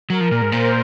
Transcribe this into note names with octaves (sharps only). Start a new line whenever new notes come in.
F#3 A#4
F3
A#2
G#2
A#2 C5